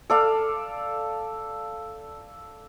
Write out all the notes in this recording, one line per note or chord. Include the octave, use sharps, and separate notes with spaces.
A4 D5 F5